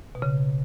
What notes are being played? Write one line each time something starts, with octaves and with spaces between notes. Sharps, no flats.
B2
C#3